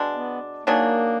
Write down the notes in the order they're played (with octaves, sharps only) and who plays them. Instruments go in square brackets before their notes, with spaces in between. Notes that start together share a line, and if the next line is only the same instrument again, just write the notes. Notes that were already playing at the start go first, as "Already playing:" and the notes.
Already playing: [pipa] B2 G#3 D4
[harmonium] B3
[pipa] D#3 F#3 D4 G#4 [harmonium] A#3